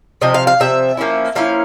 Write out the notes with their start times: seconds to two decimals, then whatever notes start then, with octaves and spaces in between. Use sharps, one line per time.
0.21 C3 F3 D#5
0.34 F5
0.47 F5
0.60 C3 F3 E5
0.97 F3 A#3 C#4 E4
1.35 F3 A#3 C#4 E4 F5